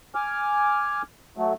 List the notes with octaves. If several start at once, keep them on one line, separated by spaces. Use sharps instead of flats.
G#5 D6 F6
F#3 A3